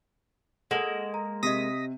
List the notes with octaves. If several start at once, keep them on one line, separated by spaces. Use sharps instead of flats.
G#3 A#3 A4 F#5 E7 F#7
A#5
C3 G4 D#5 D#6 A#6 B6